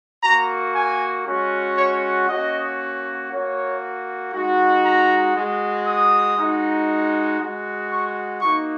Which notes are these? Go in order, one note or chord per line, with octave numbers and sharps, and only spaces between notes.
A#3 F#4 A#5
G#5
G#3 C#4 F#4
C#5
A#3 C#4 F#4 D#5
A#3 F#4 C#5
G#3 D#4 F#4
A#5
G#3 F#4
D#6
G#3 D#4 F#4
G#3 F#4
C#6
A#3 D#4 F#4 C#6